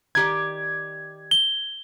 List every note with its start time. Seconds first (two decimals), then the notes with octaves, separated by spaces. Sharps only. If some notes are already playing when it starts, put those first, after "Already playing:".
0.15 D#3 G4 D5 G#6
1.31 G7